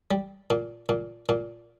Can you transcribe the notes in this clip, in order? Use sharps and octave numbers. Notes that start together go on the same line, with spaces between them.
G3
A#2
A#2
A#2